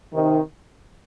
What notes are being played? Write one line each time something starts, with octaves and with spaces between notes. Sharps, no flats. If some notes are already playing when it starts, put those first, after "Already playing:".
C3 D#3